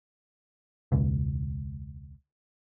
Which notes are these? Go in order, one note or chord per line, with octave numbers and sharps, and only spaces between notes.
E1 C#2